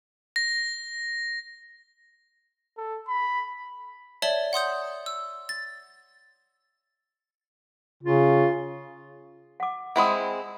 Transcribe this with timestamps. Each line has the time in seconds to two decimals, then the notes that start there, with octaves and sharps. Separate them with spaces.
0.36 A#6
2.77 A4
3.08 B5
4.22 C#5 D5 E5 A5 F#7 G7
4.53 F#5 C6 D#6 G6
5.06 E6
5.49 A6
8.04 C#3 F4
9.60 F#5 D6
9.96 G#3 C4 E4 F#5 B5 D#6